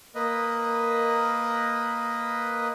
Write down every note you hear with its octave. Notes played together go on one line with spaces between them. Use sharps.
A#3 B4 D#5